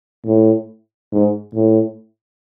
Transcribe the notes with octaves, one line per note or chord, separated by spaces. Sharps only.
A2
G#2
A2